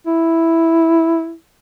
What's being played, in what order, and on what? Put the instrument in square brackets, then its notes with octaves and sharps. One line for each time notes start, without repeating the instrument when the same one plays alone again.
[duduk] E4